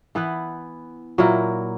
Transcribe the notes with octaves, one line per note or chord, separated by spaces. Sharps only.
E3 B3 E4 B4
A#2 F#3 A#3 E4